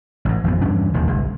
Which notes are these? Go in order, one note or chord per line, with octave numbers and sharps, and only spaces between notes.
A1 G#2
G#1 F2 A#2 B3
E2 G2 C#4 D4
E1 D#2 A#2 D#3
G1 C2 G#3